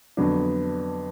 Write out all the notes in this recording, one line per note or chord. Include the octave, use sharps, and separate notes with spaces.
F2 D3 F#3 B3 D4